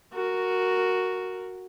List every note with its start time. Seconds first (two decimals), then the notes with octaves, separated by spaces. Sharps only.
0.13 F#4 A#4